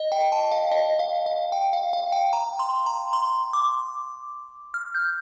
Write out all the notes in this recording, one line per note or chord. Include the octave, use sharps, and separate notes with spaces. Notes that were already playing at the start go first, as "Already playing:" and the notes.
Already playing: D#5
G5
A5
F5
D#5
F5
F5
G5
F5
F5
G5
A#5
C6
A#5
C6
D6
F6
G6